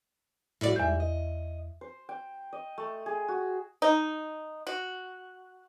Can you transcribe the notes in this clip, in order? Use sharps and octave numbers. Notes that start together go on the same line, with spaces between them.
A2 F3 G3 F#4 D5
E2 G#2 G3 E5 G6
D#5
C5
G5
D#5
A3
G#4
F#4
D#4
F#4